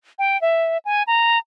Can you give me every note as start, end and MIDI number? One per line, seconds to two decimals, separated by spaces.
0.19 0.40 79
0.41 0.78 76
0.85 1.03 80
1.07 1.38 82